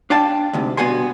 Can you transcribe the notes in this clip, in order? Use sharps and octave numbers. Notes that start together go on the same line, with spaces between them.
D4 F5 G5 A5
D2 G#2 C3
G2 B2 B3 F#4 G#5 C6